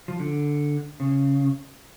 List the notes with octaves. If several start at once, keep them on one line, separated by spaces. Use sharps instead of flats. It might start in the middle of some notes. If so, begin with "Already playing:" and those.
F3
D3
C#3